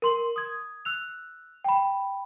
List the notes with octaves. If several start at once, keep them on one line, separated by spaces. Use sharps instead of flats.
A#4 C6 F#7
D#6 G#6
E6 F#6 F7
G5 B5